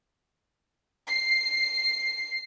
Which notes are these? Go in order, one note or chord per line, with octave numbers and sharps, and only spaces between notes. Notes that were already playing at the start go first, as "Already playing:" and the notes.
C7